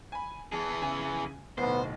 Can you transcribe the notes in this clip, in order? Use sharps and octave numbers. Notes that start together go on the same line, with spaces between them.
G#5 B5
E3 G#4 A5
C#3 G#5
D1 B1 B3 C5